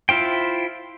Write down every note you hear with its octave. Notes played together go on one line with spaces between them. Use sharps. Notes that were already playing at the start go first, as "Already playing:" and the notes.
E4 F4 C5 G5